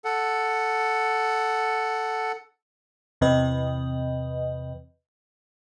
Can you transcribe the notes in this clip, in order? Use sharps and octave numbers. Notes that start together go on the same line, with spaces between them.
A4 F#5
E2 C3 E3 C4 B4 D#5